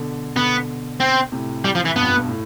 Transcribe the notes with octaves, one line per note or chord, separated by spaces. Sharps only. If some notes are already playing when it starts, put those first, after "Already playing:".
Already playing: B2 D3
B2 D3 B3
C4
A2 C3
G3
F3
E3
G2 B2 B3
F2
G2
G2 B2
A2